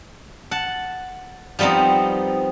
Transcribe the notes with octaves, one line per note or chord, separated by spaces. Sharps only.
F#5 A5
F3 G3 B3 C4 D#4